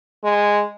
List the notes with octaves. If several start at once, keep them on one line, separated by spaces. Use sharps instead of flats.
G#3